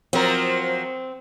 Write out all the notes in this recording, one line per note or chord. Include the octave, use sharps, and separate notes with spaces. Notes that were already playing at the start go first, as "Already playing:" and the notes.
F3 F#3 C4 A#4